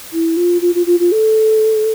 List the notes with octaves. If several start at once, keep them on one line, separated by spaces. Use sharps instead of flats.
E4
F4
F4
F4
F4
F4
A4